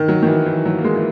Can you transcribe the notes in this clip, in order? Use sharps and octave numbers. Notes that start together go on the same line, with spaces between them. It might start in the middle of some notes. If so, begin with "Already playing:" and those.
Already playing: D#3
F#3
D#3
E3
E3
F#3
A#3
G#3
E3